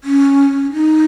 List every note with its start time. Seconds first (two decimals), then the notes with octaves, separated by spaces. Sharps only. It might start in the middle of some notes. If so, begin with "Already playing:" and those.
0.04 C#4
0.73 D#4